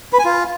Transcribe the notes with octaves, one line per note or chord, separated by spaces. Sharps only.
B4
G#5
F4